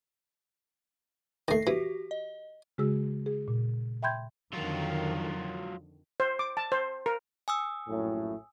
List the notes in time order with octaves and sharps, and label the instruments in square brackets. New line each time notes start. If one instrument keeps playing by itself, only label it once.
[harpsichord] D#3 A3 [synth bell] A#6 C7
[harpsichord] E3 [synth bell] F#4 G4
[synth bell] D#5
[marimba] C#3 G#3 F#4 G#4 E6
G#4
A#2
E5 G5 B5 C6 G6 G#6
[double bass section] F2 D3 D#3 [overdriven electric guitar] F#3 F4
[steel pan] C5
D6
A5
C5
A#4
[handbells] G#5 D#6 E6
[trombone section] A#1 F#2 A2